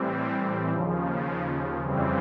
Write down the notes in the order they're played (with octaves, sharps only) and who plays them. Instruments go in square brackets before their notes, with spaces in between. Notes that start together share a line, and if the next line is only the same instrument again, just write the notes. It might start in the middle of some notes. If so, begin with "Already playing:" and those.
Already playing: [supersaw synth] A2 E3 G3 C4
D#2 C#3 F3
F2 C#3 E3 G3 C4